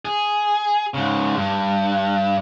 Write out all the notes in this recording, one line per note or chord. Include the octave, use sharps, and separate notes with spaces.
G#4
G#2 C#3
G2